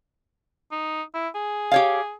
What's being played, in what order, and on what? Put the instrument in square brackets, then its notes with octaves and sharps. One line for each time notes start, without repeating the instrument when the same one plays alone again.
[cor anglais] D#4
E4
G#4
[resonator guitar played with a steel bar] G4 C#5 F5